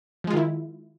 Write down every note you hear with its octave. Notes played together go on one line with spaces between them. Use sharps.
D#3 F3 G#3 E4 F4